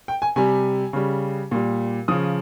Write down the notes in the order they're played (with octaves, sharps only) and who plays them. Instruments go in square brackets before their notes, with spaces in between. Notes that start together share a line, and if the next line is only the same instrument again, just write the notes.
[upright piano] G5
G#5
C3 G3 G#5
C#3 G3
A#2 G3
C#3 F3 D#6